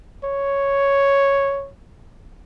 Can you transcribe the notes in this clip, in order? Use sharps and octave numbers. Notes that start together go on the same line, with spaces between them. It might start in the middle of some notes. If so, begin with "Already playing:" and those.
C#5